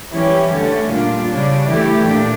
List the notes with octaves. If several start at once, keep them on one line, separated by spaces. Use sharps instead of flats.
E3 G3 C#4 E4 G4
D3 A3 C#4
A#2 G3 D4 F4
C#3 G3 D4
E3 A3 E4 G4
A#2 D4